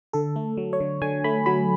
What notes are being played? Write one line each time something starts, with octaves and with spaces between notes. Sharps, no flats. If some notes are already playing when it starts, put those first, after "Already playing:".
D3 A4
A3
F#3
C#5
D3
D3 G#5
A3 B5
F#3 B5